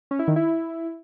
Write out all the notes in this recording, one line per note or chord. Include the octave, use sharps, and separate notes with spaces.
C#4
E4
D#3
E4